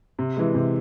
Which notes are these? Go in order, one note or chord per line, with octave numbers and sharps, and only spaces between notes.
C3
E3 G#3
C3